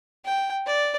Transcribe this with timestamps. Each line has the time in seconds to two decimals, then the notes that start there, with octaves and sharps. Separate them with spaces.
0.25 G5
0.66 D5